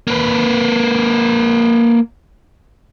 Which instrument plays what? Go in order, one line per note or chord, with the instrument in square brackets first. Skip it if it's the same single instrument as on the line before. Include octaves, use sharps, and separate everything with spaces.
[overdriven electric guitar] A#3 B4